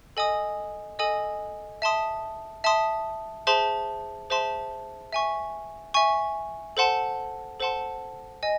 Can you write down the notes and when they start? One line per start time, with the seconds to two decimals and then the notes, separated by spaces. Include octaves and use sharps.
0.17 A4 D#5 G#5 D#6
0.99 A4 D#5 G#5 D#6
1.82 E5 A5 C6 D#6
2.64 E5 A5 C6 D#6
3.47 G#4 C5 E5 A5 C6
4.30 G#4 C5 E5 A5 C6
5.13 E5 G#5 C#6
5.94 E5 G#5 C#6
6.77 A4 C5 F#5 A5 C6
7.60 A4 C5 F#5 A5 C6
8.43 D#5 G#5